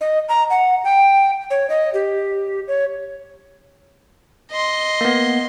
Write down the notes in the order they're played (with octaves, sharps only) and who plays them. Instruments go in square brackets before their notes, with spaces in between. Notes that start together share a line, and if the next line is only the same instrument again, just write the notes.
[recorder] D#5
A#5
F#5
G5
C#5
D#5
G4
C#5
[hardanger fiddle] D#5 C6
[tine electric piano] A#3 B3